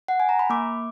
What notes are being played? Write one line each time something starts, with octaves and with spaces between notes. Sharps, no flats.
F#5
G#5
A#5
B5
A#3 D6